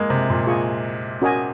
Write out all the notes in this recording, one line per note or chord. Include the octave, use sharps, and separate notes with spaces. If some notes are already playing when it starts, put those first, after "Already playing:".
Already playing: G#3 A#3
C3
A#2
F4 G#4 D#5 G#5 C#6
C#4 F#4 A#4 D#5 G#5